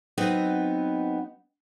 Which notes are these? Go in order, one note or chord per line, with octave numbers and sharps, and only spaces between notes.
F#3 B3 C4 D#4 B4 D#5